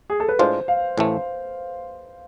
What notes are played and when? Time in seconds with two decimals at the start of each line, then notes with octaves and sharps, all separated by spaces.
0.10 G#4
0.20 A4
0.29 B4
0.39 A2 G#3 D4 F4 C5
0.68 F5
0.98 A1 A2 E3 A3